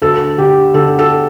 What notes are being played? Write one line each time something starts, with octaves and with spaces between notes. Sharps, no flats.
D2 A4
D3 G4
D3 A4
A4